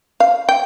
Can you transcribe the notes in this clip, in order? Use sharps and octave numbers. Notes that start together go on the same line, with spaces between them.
F5
G5